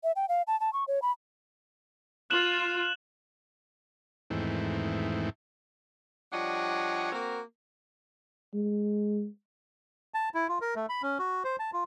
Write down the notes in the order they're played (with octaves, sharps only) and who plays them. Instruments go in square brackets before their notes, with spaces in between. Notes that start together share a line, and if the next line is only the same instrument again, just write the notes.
[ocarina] E5
G5
F5
A5
A5
C#6
C#5
B5
[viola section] F4 [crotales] F#6 E7 F#7
[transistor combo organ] E2 G#2 D#3 E3 A3 C4
[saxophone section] F3 G3 D4 C#5 D#5 F#5
A#3 C4 F#4 A#4
[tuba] G#3
[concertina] A5
E4
F4
A#4
A3
B5
C#4
F#4
C5
A5
F4